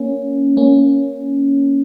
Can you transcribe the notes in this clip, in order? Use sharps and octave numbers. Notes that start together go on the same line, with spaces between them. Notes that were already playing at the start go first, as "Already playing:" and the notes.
Already playing: A#3 C#4
A#3 C#4